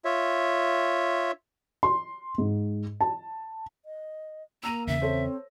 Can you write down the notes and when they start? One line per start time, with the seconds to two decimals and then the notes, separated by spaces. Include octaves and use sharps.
0.05 F4 C#5 E5
1.83 C6
2.38 G#2
3.01 A5
3.86 D#5
4.63 A#3 A#5 E6 A#6 D#7
4.87 E2 C#3 E5
5.02 C4 A4 C5 C#5